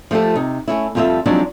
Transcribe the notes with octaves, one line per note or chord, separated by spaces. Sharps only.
F3 A3 F4 G4 A4
C3 D#4
A3 A#3 C#4 E4
F2 G3 F4 G#4 A4 E5
F3 F#3 G#3 C4 D4 D#4